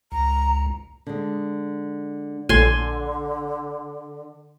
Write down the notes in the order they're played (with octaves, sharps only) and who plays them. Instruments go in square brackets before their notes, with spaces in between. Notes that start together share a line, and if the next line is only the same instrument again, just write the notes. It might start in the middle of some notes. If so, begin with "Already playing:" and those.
[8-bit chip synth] C#2 [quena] A#5
[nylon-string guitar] D3 G#3
[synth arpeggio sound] A#1 A4 [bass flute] D3 [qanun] G#5 C6